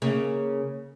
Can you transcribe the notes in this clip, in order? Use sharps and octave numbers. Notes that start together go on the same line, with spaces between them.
C#3 A#3